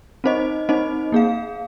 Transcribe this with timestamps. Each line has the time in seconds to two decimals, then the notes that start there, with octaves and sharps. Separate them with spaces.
0.24 C4 D#4 C5 D#5
0.69 C4 D#4 C5 D#5
1.12 A#3 G#4 F5